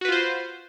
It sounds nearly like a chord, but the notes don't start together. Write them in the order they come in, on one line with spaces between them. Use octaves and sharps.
F#4 B4 F4 C5